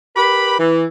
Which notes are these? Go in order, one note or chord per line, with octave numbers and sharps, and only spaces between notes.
G4 A#4 B4 B5
E3